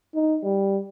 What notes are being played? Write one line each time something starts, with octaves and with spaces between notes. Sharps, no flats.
D#4
G3